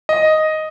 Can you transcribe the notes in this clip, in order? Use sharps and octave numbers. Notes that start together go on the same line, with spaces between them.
D#5